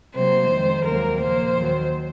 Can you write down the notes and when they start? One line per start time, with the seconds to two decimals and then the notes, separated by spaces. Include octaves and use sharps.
0.15 C3 F#3 A#3 C5
0.50 F2 D#3 G#3
0.85 D#2 C#3 F#3 A#3 A#4
1.20 A#2 F3 A#3 C5
1.56 D#2 D#3 F#3